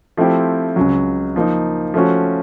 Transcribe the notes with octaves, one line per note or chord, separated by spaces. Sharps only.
F3 A3 C4 E4 G4
C#2 C#3 F#3
F3 A#3 D#4
F3 A3 C#4 F#4